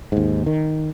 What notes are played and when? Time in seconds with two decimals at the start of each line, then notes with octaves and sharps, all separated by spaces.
0.12 D#2 G#2
0.46 D#3